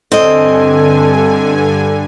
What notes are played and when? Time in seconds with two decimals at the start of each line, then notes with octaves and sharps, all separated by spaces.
0.12 G2 D3 C4 A4 D#5 G#5